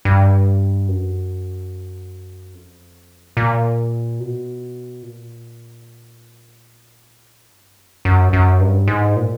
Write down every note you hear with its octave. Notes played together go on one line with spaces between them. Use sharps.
G2
F#2
F2
A#2
B2
A#2
G2
F#2
F#2
F#2
G2
G#2
A#2